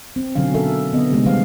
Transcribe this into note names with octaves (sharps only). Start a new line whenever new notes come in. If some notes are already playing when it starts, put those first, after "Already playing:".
C4
B2 D3 F#3 C#4 F5
A4 A#4 E5
D3 B3 C4 D#5
C3 G#3 A3 B3 C#4 G4
D#3 G3 A3 C5 F5